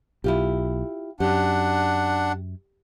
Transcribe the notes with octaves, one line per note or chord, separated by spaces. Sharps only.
B1 E4 F4 G4
F#2 D4 G4 F#5